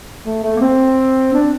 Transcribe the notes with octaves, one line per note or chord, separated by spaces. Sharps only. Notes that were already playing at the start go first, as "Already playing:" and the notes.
A3
A3
A#3
C4
D4